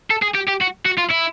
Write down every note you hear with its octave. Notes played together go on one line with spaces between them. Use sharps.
A4
G#4
G4
G4
F#4
F#4
F4
E4